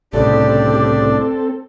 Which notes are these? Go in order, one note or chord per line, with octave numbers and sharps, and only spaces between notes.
C2 A2 C#3 C4 D4 G4 A4 D5